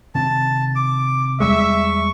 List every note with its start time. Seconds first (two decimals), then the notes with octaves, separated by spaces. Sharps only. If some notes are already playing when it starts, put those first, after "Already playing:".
0.15 C3 D#3 C4 A5
0.75 D6
1.40 E2 G3 G#3 E5 C#6